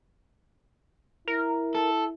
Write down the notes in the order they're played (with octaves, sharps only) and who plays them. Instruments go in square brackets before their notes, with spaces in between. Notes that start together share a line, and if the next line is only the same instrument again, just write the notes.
[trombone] E4 [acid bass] A#4
[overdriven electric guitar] A4